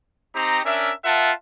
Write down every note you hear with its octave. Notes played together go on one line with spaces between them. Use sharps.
C4 D#4 G4 A#5
C#4 D4 A#4 E5
F4 A#4 E5 F#5 A5